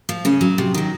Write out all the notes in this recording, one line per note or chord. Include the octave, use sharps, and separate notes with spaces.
F3
C#3 C#4
F#3
C3
D#3 F#3